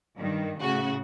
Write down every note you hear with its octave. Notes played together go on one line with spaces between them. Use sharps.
G2 D#3
A2 C#3 F#4